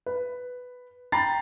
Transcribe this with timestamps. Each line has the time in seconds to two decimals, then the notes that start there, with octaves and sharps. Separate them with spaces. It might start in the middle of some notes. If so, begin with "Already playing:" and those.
0.06 B4
1.12 G5 A#5 B5 A6 C7